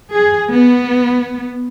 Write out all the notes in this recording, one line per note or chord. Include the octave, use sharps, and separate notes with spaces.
G#4
B3